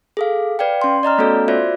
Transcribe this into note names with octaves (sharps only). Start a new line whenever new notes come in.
G#4 A4 F5
B4 D5 F5 G5
C#4 C6
D5 D#5 A#5 F6
A3 B3 C#4 F#4 A4 C#5
F4 F#4 C5 D5 E5